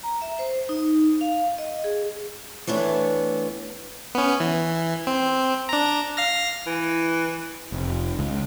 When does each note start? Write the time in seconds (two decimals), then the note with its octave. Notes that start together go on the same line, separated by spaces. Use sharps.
0.03 A#5
0.22 E5
0.39 C5
0.69 D#4
1.21 F5
1.58 D#5
1.84 G#4
2.67 E3 A3 B3 D4 C#5
4.15 B3 C#4
4.40 E3
5.07 C4
5.69 D4 A#5
6.17 F5 F6 A#6
6.67 E3
7.72 F1
8.19 C#2